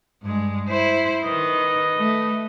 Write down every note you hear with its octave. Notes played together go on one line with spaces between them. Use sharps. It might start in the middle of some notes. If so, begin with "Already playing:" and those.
G2 G#3
E4 C5
D#3 B4 D#5
A3